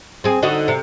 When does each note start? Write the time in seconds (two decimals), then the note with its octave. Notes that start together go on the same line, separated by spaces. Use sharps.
0.24 C4 G#4
0.43 D3 D#4 F#4
0.68 C3